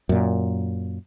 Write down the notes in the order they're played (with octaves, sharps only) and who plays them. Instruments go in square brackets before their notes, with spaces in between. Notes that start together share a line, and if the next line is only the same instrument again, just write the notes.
[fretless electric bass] F#2 A#2